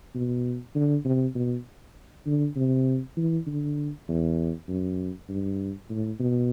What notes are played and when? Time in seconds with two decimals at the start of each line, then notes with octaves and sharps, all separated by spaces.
0.15 B2
0.75 D3
1.05 C3
1.35 B2
2.26 D3
2.56 C3
3.17 E3
3.47 D3
4.08 E2
4.68 F#2
5.29 G2
5.90 A2
6.20 B2